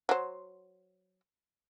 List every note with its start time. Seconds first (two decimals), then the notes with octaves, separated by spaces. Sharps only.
0.09 F#3 C5